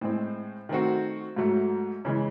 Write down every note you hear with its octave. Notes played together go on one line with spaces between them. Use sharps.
A2 G#3 C4
D#3 A3 C4 F#4
G#2 F#3 A3
C#3 E3 G#3